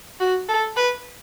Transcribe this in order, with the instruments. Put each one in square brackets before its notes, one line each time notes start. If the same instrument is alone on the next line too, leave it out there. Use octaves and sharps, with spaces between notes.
[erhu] F#4
A4
B4